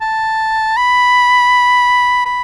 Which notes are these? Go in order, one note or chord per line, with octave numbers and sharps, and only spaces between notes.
A5
B5
B5